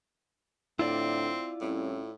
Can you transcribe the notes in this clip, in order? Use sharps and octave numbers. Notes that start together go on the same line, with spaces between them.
A2 D3 C4 E4 F4 D5
C2 A2 C#4